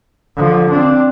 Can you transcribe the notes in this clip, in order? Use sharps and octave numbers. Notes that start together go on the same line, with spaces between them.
D3 F3
C4 D4